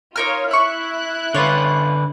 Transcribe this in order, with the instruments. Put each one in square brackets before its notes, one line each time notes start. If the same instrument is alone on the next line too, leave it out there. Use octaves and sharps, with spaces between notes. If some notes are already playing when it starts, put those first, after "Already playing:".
[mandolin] D#4 A#4 F6 [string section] F4 C#5
[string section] E4 F#6 [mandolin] E5 C#6
[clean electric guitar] D3 B4 [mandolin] C#4 F4 C#5